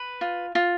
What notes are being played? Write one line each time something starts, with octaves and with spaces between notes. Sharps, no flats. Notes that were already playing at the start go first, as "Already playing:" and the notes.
Already playing: B4
F4
F4